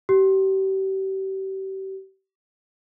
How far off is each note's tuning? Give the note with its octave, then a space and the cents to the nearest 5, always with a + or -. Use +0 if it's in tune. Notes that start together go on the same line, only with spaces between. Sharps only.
G4 -35